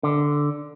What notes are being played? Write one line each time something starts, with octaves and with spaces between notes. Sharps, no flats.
D3